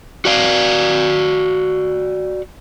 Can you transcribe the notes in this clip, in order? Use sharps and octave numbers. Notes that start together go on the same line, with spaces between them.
F#4 D5 F5